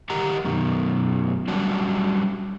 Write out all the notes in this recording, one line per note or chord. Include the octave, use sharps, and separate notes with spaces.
D#3 G4 A#4 D#5 F#5 A#5
F#2 B2 D#3
F#3 G3 C#4 D4 F#4